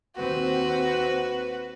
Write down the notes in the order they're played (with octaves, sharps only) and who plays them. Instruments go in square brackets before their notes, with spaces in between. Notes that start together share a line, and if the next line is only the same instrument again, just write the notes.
[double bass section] D#2 C4 [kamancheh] F#4 B4